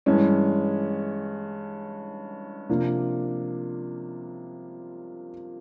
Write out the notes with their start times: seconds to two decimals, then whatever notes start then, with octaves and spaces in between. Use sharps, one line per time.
0.06 G2 E3 G#3 C#4
2.70 C3 F3 A#3 D4